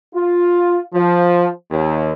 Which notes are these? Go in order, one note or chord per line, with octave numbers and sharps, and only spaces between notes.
F4
F3
D#2